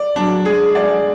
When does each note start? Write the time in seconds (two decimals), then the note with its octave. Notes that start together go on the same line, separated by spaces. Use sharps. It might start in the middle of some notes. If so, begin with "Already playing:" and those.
Already playing: D5
0.15 F#3 D4
0.45 G#3 G#4
0.75 G#3 D5